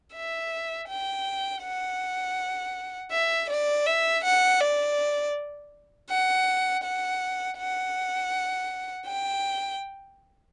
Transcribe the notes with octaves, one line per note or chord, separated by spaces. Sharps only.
E5
G5
F#5
E5
D5
E5
F#5
D5
F#5
F#5
F#5
G5